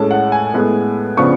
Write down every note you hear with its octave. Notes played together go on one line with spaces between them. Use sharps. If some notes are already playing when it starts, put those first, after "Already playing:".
Already playing: A2 G#3 C#4 A5
F#5
G#5
A2 G#3 B3
C#3 F3 B3 D4 C#6